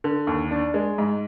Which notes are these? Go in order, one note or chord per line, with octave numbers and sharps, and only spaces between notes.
D3
D#2
D4
G#3
G#2